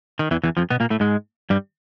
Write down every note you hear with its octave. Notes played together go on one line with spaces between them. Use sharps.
D#3
E2 E3
E2 E3
F2 F3
B2 B3
A#2 A#3
A2 A3
G#2 G#3
G2 G3